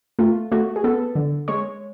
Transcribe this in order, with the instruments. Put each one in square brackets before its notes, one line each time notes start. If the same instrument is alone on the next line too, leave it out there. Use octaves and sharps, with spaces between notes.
[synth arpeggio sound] A3 F4
A3 F#4
G#4
B3 A4
D3
G#3 C#5